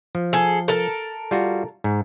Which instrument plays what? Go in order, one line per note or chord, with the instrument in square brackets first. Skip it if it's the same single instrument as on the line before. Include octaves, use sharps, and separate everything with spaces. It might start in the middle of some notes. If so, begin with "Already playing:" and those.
[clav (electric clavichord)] F3
[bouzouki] G#4 A4
A4 A#4 A5
[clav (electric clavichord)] G3 F4 F#4
G#2